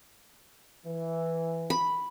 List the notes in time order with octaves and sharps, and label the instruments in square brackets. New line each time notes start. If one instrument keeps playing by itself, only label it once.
[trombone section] E3
[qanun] B5